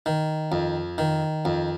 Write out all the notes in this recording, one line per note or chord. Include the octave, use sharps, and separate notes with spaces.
D#3
F2
D#3
F2